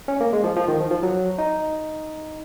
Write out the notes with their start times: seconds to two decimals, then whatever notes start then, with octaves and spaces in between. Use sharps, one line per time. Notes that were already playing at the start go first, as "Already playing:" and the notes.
0.08 C#4
0.20 A#3
0.33 G#3
0.44 F3
0.56 F3
0.68 D#3
0.80 F3
0.91 F3
1.03 F#3
1.38 D#4